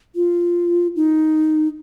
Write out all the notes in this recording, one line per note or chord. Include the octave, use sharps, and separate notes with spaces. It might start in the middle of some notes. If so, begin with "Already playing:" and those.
F4
D#4